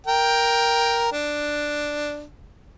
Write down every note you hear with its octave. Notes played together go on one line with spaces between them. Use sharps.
A#4 G5
D4